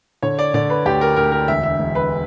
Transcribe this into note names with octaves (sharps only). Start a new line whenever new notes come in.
D3 C#5
D5
D3 D5
B4
D2 G4
A#4
D2 A#4
A#4
E1 E5
E5
E1
B4